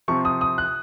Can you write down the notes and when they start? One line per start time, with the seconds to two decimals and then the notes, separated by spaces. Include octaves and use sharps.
0.08 C3 F3 C4 C#6
0.25 D#6
0.41 D#6
0.58 F#6